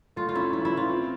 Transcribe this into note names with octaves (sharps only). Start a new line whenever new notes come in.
A3 F4
F4
C#4 E4
E3 E4
E4
E3
F4
C4